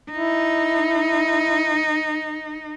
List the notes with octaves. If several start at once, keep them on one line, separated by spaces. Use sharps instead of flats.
D#4 E4